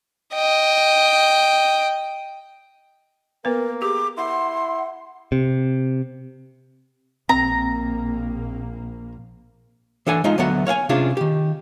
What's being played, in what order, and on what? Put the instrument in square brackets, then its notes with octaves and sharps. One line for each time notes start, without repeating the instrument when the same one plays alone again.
[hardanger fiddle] D#5 G5
[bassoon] A#3 [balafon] B3 B4 [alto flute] A#4
[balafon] G4 [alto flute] G#4 [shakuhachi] D6
[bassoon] E4 [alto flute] F#5 [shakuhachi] C6
[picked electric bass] C3
[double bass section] A#1 A#3 [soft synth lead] C4 [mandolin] A#5
[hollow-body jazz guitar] E3 D4 A4 F#5 G#5
G#3 D#4 F4
D2 F#3 A3 B3 F#5
C#5 F5 F#5 G#5
C3 C#4 D4 F4 G#4
D#3 G4